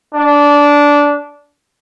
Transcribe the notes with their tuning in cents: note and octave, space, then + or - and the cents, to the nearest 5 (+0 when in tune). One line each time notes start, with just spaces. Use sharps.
D4 -15